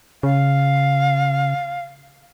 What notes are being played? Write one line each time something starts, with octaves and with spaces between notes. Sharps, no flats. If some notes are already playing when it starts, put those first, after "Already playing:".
C#3 F5